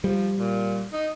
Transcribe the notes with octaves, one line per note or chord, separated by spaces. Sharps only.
F3 G3
A#2
D#4